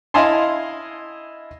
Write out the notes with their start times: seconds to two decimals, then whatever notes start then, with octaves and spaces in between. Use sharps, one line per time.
0.14 E4 D#5 F5 G#5 A5 C6